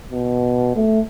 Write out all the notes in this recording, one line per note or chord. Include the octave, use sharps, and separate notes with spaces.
B2
A3